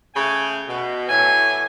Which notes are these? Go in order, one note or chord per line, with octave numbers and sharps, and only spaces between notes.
C#3 A3 G5 G#5
B2
A2 E3 F#3 G#5